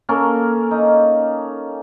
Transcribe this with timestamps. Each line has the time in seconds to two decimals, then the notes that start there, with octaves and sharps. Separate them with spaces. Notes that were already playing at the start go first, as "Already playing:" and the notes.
0.09 A#3 C#4 A4 A#4
0.71 D#4